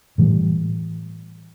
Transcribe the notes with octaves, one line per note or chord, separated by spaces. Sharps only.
A2 E3 G3